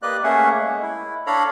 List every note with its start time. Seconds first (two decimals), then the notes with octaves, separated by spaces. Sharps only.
0.02 A#3 G4 B4 D5 D#5 F#6
0.23 A3 A#3 C#4 G#4 E5 F#5
0.61 G#3
0.82 E4
1.27 D4 A4 C#5 F5 A#5 B5